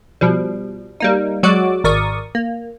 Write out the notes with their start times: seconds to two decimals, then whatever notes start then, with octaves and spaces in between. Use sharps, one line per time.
0.21 B2 F3 G3
1.00 G3 A#3 D#4
1.43 F#3 G#3 F#4 D5 D6
1.84 G#1 A#4 D5 C#6 D#6
2.35 A#3